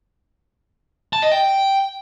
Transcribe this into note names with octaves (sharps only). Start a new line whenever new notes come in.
A5
D#5
G5